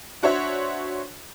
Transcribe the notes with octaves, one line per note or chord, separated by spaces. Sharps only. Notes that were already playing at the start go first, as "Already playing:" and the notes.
D4 F#4 C5 C#5 E5 C6